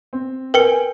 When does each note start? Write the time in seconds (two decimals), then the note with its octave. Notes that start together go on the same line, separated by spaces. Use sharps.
0.13 C4
0.54 A#4 B4 G5 G#5 C#7